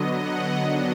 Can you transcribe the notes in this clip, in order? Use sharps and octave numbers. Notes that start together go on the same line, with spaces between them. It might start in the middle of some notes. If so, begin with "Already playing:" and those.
Already playing: D3 F#3 B3 D#5
F#5
D#3 F#3 B3 D4 D#5